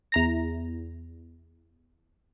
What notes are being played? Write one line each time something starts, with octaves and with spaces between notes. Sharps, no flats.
E2 A#5 A#6